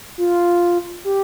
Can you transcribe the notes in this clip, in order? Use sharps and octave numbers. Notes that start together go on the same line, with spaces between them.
F4
G4